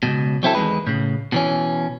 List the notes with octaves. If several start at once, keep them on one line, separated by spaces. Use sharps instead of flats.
C#2 F#2 B2
F#3 C4 E4 A4
E2 D#3 G#3 B4
A2 C#3
B2 E3 C#4